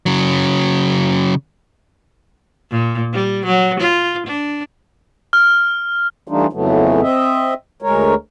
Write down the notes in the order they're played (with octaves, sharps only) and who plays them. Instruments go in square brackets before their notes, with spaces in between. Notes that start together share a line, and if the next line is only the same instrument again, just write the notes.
[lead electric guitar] C#3 F#3
[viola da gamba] A#2
G3
F#3
F4
D4
[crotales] F6
[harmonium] E3 G3 A3 D4 D#4 F4
F2 C#3 E3 F#3 A3 B3
C4 D#5 E5
D2 G#3 A#4 C#5